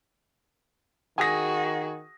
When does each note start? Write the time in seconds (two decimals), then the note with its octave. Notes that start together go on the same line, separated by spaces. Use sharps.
1.18 D#3 F#4 G#4 G#5 D#6 A#6